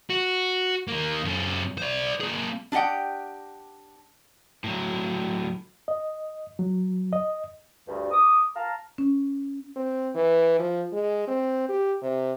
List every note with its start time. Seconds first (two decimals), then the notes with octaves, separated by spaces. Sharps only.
0.10 F#4
0.88 D#3 A#3
1.24 F#2 A4
1.78 C5 D5
2.21 A#3 G#4
2.72 D4 G4 D#5 F#5 G5
4.64 A2 F#3
5.88 D#5
6.59 F#3
7.13 D#5
7.87 D2 G2
8.11 D6 D#6
8.55 F5 A5 A#5
8.98 C#4
9.76 C4
10.15 E3
10.59 F3
10.93 G#3
11.28 C4
11.69 G4
12.02 C3